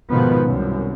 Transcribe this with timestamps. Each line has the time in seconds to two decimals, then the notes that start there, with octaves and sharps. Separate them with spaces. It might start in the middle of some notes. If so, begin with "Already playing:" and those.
0.10 F2 G#2 B2 D#3 F3 B3
0.42 C2 F#2